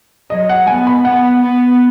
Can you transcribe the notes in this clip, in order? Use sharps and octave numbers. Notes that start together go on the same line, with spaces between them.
F#3 D#5
F#5
B3 G#5
B5
B3 F#5
B3